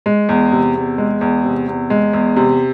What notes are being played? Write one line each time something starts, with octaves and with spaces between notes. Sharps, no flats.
G#3
E2
C3
E2
G#3
E2
C3
E2
G#3
E2
C3